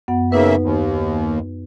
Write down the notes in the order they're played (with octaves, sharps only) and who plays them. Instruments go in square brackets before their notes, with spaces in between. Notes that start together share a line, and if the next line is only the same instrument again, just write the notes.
[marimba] F#2 B3 F#5
[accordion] C#3 A#3 E5 [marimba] D#4 B4
[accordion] D#2